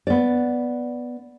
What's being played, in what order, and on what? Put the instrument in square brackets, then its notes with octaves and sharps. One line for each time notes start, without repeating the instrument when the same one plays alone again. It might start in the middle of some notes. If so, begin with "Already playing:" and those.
[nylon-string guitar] B3 D5